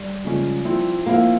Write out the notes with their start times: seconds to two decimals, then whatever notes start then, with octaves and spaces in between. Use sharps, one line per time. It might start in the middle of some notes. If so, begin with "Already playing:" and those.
Already playing: G3
0.24 C#3 F3 G#3 C#4
0.65 F3 C4 E4
1.06 F3 A#3 C4 E4